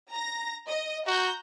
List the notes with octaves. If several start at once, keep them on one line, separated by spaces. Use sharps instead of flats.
A#5 A#6
D#5
F#4 A#5 G6